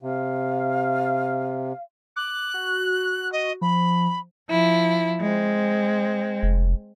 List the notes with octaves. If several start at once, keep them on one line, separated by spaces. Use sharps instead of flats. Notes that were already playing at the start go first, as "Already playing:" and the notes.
C3 F5
D6 F#6
F#4
D#5
F3 B5
F3 E4
G#3 C4
F1